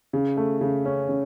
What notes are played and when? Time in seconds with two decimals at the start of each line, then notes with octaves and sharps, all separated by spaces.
0.13 C#3
0.37 A3
0.61 C#3
0.85 C#4
1.09 C#3